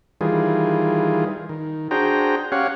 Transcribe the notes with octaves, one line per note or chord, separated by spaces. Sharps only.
D#3 E3 G3 F4 G#4
D#3
D4 F#4 G#4 C5 G5 A#5
C#4 G4 C#5 F5 F#5